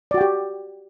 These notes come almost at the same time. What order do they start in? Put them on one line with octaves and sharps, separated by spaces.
D5 F#4 G5 G4